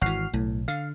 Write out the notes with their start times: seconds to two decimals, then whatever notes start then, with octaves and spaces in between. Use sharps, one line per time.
0.01 G#1 E3 F#4 F6 C7
0.34 B1 A2
0.68 D3 F5